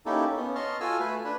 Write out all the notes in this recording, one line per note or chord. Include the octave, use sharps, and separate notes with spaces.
A#3 C#4 D#4 E4 G4 A4
B3 C#4
D#5 A5 C6 C#6 F6
F4 F#4 A4 G#5 E6 F6
A3 B4 G#5
D4 B4